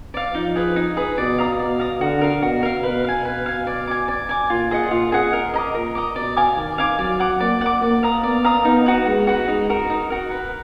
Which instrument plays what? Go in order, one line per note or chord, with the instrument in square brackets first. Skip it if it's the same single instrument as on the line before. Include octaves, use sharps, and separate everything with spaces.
[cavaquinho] D5 F5
[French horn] F3 [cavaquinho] D#4
[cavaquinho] G#4 B4
D#4
G#4 B4
[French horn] B2 [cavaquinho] D5
[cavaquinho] F5 A#5 D#6
[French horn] B2 [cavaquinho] D5
[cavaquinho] F5 A#5 D#6
[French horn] D3 [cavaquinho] F#4
[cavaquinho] A#4 F5
[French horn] B2 [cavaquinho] F#4
[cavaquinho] A#4 F5
[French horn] B2 [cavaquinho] B4
[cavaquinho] F5 G#5
[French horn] B2 [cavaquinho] B4
[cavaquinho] F5 G#5
D5
G#5 D6
D5
G#5 D6
[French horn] A#2 [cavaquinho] F4
[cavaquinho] G#4 D#5 F#5
[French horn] A#2 [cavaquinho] F4
[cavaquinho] G#4 D#5 F#5
A#4
D#5 A#5
D6
[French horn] A#2 [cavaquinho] A#4
[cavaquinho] D#5 A#5 D6
[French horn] B2 [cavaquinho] D5
[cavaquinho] F5 G#5 D6
[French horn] D#3 [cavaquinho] D5
[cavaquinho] F5 G#5 D6
[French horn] F#3 [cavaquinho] D5
[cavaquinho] F#5 D6
[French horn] A#3 [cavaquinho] D5
[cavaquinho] F#5 D6
[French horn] A#3 [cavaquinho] D5
[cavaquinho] F5 A#5 D#6
[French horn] B3 [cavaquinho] D5
[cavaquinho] F5 A#5 D#6
[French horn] B3 [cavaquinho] D#4
[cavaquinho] F#4 B4
[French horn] G#3 [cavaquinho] D#4
[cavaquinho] F#4 B4
[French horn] G#3 [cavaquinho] D#4
[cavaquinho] F#4 A#4
D#4
F#4 A#4
B4